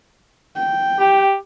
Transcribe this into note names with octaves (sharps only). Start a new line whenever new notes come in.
G5
G4